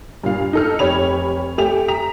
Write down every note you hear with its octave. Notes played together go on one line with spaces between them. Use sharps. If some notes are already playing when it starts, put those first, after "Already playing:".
G2 A#2 F5
D#4 A4 F6
F1 G4 C#5 B5 F7
A3 G4 G#5 F7
A#5 B6 F7